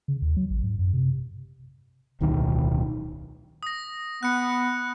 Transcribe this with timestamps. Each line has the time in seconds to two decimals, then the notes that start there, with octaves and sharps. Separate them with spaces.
0.08 C#3
0.22 D#2
0.37 F#3
0.50 A1
0.63 G#2
0.79 F#2
0.93 C3
2.21 D1 B1 D#3
3.63 D#6 A#6
4.23 B3 F#6 C#7